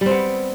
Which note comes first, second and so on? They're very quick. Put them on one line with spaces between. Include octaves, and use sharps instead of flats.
G3 C4 B3